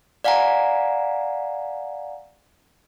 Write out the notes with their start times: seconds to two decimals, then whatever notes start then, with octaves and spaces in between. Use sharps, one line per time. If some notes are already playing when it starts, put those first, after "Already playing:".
0.24 D5 F5 F#5 G#5 A#5